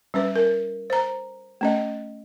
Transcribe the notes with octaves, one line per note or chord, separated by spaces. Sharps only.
G3 C#4 B4
A#4
C5 A#5
A3 C#4 D#5